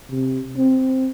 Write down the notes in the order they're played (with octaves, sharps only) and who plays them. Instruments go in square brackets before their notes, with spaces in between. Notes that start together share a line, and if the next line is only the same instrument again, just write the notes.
[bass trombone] C3
C4